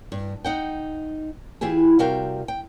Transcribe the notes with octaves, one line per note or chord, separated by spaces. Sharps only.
G2
D#4 F#5 G5
E3 E4 F4 G4 G#4
C3 G3 F#4 A#4 F5 G5
G5